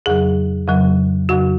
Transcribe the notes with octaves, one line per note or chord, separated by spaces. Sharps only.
F2 C#3 F#3 G#4
F2 C#3 F#3
F2 C#3 F#3 F#4